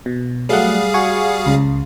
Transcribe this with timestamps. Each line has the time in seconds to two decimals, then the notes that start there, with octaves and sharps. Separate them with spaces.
0.06 B2
0.49 F#3 G3 A3 G#4 F5 F#5
0.94 F#4 G#5 C#6
1.46 C#2 C#3